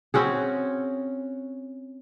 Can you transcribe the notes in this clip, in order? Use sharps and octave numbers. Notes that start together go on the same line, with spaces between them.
C4 C#4 F#4 G#4